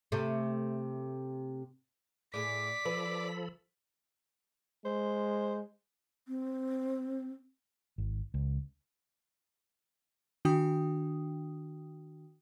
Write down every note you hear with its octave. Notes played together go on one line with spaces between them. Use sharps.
C3 A3
A2 G#4 D5 B6
F3 A4 B4 B5
G#3 C5
C4
G#1
C#2
D#3 D4 F#4 G5 D#6